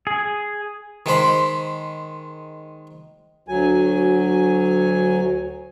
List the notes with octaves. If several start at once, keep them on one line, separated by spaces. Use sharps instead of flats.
G#4
D#3 G#3 C5 B5
D2 F#3 G#5